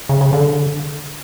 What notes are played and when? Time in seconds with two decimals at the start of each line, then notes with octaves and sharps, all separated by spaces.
0.09 C#3
0.21 C#3
0.33 D3